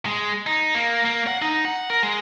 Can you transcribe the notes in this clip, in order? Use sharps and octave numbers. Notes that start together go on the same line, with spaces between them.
G#3
D#4
A#3
A#3
F#5
D#4
F#5
A#4
G#3